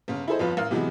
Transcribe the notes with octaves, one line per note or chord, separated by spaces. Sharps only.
G1 C#3
E4 G#4 A4 C5 D#5
G1 F2 F3 F4 B4
A1 A#4 F5 F6
C3 E3 F#3 G#3 B3